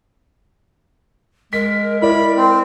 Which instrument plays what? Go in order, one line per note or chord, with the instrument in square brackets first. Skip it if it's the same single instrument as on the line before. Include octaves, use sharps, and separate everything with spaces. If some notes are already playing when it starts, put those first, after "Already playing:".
[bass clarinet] G#3 [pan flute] A#4 [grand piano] B6
[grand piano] E4 D5 [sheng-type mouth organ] B5
[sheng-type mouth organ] C4